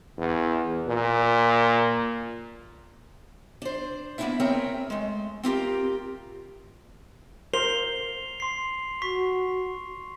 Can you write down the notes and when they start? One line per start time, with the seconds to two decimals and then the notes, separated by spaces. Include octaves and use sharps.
0.18 E2
0.88 A#2
3.62 D4 C5
4.18 A#3 B3 C#4 D4 E4 E5
4.40 C4 G#4 A#4 C#5 E5 G5
4.90 G#3 A3
5.43 C4 F4 G4 A#4
7.54 A#4 C5 C7 F7 G7
8.40 C6 C7
9.02 F#4 C#6 B6